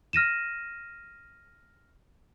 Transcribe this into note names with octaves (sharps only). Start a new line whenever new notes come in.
F6 A#6 D#7 E7